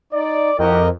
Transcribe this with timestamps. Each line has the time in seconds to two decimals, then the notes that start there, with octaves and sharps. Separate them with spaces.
0.13 D#4 D5
0.59 F2 E4 F#4 G4 A#4 D#5